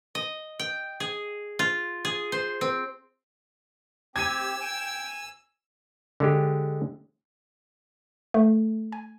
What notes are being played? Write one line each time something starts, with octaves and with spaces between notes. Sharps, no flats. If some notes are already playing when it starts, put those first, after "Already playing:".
D#5
G5
G#4
F4
G#4
C5
C4
C4 G4 E6 G#6 D#7
G5 G#5
D3 G#3 G4
A3
G#5